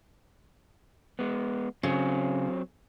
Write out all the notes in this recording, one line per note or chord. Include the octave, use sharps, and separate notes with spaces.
G#3 B3
C#3 F#3 C4